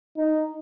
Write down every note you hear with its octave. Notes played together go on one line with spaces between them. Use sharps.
D#4